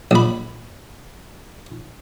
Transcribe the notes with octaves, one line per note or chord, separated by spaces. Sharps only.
A#1 B5